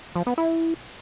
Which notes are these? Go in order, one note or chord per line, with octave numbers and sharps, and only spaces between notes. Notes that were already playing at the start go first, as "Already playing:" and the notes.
F3
B3
E4